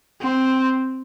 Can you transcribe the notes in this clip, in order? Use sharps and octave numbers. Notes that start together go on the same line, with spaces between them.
C4